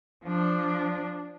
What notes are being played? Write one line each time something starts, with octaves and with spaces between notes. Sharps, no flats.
F3 D4